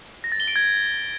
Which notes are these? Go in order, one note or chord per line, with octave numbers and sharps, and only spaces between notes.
A#6
A6
G7
D7
G#6